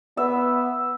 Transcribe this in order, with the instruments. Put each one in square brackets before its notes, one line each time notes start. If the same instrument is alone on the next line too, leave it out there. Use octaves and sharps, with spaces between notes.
[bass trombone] B3 [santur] E5